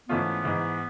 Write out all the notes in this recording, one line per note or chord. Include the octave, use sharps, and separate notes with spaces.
G#2 E3 A3 B3 C#4 F4
G#2 E3 G#3